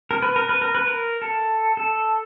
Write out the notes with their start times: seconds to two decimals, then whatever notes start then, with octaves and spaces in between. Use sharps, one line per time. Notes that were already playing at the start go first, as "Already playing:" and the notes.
0.11 A#4
0.22 B4
0.36 A#4
0.49 B4
0.62 A#4
0.75 B4
0.87 A#4
1.22 A4
1.77 A4